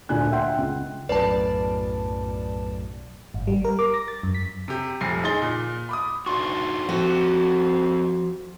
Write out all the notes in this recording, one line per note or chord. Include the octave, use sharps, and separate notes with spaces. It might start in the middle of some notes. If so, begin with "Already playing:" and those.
D2 A#2 D3 G#5 F#6
E5 F#5 G5 C6
C#2
B1 F#2 A2 B4 D5 A5
G#1
G3
A#4
D6
A#6
A6
F#2
B6
C3 G4
F1 A#1 C7
D#4 G#4 C6 A6 G7
A#2
B5 D6 D#6
D4 D#4 F#4 C6 C#6
F3 C4 F#4 G4 A4